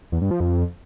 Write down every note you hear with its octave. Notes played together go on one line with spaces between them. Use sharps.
E2
G2
F3
F2